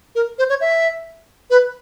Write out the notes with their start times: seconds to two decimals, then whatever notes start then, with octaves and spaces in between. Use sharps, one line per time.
0.15 A#4
0.39 C5
0.50 C#5
0.61 E5
1.50 B4